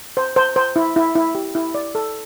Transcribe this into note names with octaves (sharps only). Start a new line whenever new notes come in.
C5
C5
C5
E4
E4
E4
G4
E4
D5
A4